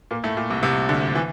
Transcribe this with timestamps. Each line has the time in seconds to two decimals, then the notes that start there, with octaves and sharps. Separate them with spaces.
0.11 A#2 A#3
0.24 A2 A3
0.37 A#2
0.50 C2 C3
0.63 C2 C3
0.89 D2 D3
1.15 E3